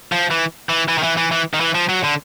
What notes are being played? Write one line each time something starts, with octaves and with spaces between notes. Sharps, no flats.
F3
E3
E3
E3
D#3
E3
E3
E3
D#3
E3
F3
F#3
D3